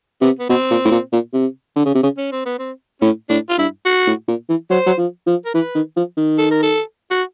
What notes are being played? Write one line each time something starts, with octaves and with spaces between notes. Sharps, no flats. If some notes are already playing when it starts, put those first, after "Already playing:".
C3 B3
B3
B2 C4
A#2
A2
A#2
A#2
C3
D3
C#3
C3
C#3
C#4
C4
B3
C4
A2 C#4
A2 D4
F4
G2 E4
F#4
A2
A#2
E3
F#3 C5
F#3
F3
F3
A#4
E3 B4
D#3
F3
D#3
A4
A#4
A4
F#4